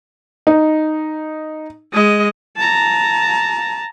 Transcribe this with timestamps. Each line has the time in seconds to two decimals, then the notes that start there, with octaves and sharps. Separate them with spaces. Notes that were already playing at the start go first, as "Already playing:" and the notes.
0.47 D#4
1.93 G#3 D#5
2.57 A5 A#5